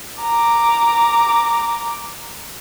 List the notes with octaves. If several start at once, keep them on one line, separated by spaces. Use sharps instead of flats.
A#5 D6